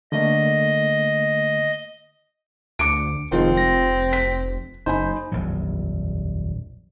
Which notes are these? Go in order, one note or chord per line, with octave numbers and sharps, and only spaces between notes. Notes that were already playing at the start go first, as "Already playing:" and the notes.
D3 A3 A#3 D#5
D2 D6 C#7 D7
F1 D#3 F3 G#3 C4 F4
A#6
B6
F#1 D#4 C5 G#5 B5
D#1 A#1 F2 F#3